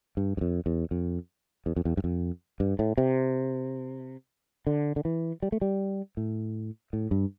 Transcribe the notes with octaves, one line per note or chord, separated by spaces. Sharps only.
G2
G2
F2
E2
F2
E2
F2
E2
G2
F2
G2
A2
C3
D3
D3
E3
G3
A3
G3
A2
A2
G2